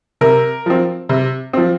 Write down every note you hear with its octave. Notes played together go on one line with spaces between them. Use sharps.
C3 A#4
F3 C4
C3
F3 C4